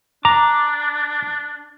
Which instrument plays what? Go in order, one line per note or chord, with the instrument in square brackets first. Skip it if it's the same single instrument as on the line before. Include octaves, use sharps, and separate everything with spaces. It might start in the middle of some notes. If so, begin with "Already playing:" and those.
[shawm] D4 [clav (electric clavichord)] A#5 [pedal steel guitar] D6